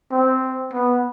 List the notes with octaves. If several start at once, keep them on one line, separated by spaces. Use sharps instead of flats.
C4
B3